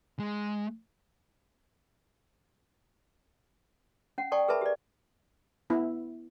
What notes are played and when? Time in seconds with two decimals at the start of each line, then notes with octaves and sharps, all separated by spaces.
0.19 G#3
4.18 C#4 F#5
4.32 A4 D5 G5 A5 C#6
4.48 G#4 A#4 B4 E5 A5 B5
4.61 G4 D5
5.70 B3 E4